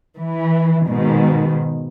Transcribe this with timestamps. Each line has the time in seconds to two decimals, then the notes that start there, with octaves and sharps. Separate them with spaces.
0.17 E3
0.87 G#2 B2 D#3